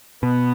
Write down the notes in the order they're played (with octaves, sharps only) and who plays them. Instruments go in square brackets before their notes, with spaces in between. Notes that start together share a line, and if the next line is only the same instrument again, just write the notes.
[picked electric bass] B2 [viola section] B3